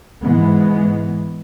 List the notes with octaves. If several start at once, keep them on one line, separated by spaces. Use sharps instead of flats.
G#2 E3 G#3 B3